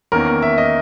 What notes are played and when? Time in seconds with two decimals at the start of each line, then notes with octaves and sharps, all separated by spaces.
0.12 E2 D#3 A#3 C#4 A#4
0.43 E5
0.58 D#5